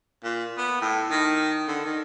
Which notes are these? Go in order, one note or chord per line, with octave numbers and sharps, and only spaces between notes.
A#2
B3
A2
D#3
D3
D#3